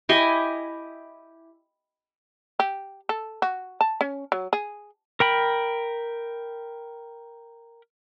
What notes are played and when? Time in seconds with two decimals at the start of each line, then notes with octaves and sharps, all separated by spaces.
0.09 E4 G4 D#5 G#5
2.60 G4
3.09 A4
3.42 F#4
3.81 A5
4.01 C#4
4.32 F#3
4.53 G#4
5.20 A#4 G5 B5